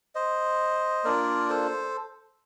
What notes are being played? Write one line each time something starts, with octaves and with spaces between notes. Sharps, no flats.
C5 D#5
A#3 D4 F4 A#4 D5
A4 C5